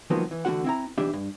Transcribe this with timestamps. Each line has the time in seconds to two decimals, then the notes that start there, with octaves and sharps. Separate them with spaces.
0.10 C2 D#3 F3 F#3 A#3 B3
0.31 E3
0.45 D3 E3 A3 C#4 F#4 F#5
0.64 C4 E4 A#5
0.98 B1 E3 D4 G4 E5
1.13 G2